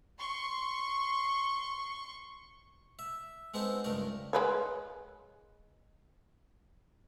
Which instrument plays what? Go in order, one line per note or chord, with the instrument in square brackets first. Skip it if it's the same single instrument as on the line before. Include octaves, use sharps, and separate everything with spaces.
[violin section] C6 C#6
[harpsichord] E5
G#3 B3 C4 D#4 A4
C#2 G2 A3 A#4 D5
[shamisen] G#3 B4 C#5